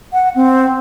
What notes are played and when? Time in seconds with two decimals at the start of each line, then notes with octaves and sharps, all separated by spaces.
0.13 F#5
0.35 C4